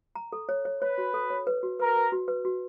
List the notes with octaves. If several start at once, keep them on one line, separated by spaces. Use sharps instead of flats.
A#5
A4
C#5
C#5
B4 C#5
F#4
A4
C#5
B4
F#4
A#4 B4
B4
F#4
B4
F#4